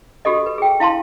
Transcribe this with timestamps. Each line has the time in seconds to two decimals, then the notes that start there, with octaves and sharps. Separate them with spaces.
0.25 F#4 G4 A4 D#5
0.46 B4
0.58 G#4 G5
0.80 E4 F5 A5 C6